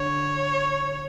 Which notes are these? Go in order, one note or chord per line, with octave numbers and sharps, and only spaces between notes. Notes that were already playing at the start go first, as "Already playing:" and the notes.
Already playing: D3 C#5